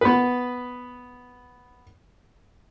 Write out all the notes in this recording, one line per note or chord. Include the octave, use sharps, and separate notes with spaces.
B3 B4